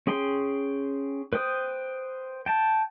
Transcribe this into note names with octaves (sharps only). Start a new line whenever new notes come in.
C#4 G#4 G5 C6
B4 C5 G5 D#6
G5 A5